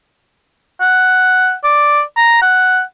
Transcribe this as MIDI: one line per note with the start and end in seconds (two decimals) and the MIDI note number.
0.81 1.54 78
1.64 2.01 74
2.17 2.39 82
2.42 2.81 78